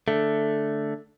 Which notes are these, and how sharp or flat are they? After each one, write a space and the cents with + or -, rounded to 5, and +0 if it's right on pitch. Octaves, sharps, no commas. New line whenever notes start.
D3 +0 A3 +0